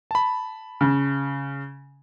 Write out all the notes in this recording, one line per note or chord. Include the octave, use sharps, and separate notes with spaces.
A5 B5
C#3